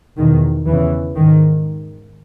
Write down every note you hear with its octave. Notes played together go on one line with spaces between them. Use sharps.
E2 B2 D#3
E2 C#3 E3
G#2 D#3